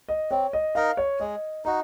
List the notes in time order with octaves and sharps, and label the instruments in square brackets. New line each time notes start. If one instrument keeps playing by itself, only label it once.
[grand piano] D#5
[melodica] C4 [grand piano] C#5
[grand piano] D#5
[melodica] D#4 A#4 D#5 [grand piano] F5
[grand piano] C#5
[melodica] G#3 [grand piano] D#5
[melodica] D#4 F#4 [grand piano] D#5